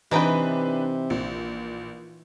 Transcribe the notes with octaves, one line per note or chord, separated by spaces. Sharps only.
C3 E3 D4 D#4 B4 G5
A#1